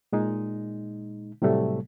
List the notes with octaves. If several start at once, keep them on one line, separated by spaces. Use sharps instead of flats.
A#2 G#3 D#4
A2 C3 F#3 G3 A3